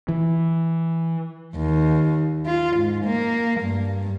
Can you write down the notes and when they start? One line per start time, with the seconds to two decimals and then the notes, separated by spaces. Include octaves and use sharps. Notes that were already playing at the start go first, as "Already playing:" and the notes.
0.09 E3
1.56 D#2
2.46 F4
2.77 G#2
3.06 A#3
3.61 G2